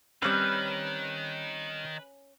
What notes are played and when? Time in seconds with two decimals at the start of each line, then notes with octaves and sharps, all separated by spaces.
0.22 D#3 G3 C4 C#4 B4 C#5 G6